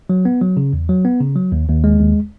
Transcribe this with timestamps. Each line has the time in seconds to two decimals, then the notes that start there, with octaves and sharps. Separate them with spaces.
0.10 F#3
0.25 B3
0.41 F#3
0.57 C#3
0.73 E2
0.89 F#3
1.05 B3
1.21 C#3
1.36 F#3
1.52 D#2
1.68 D#2
1.84 G#3
1.99 D#2